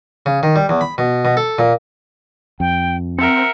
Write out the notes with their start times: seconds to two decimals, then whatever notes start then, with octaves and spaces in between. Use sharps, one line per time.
0.26 C#3
0.43 D#3
0.56 G3
0.69 E2
0.81 B5
0.98 B2
1.25 B2
1.37 A4
1.59 A#2
2.60 F2 G5
3.18 C4 A#4 E5 F#5 C#7